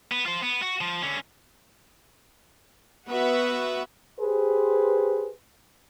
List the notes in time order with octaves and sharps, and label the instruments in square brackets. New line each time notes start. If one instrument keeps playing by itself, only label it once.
[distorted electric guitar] B3
F4 C5
B3
F#4
F3
D3 C#4
[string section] B3 F#4 B4 E5 F#5
[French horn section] G4 G#4 B4 C5